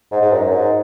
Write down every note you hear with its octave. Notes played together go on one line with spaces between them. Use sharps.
G#2
G#2
F#2
G#2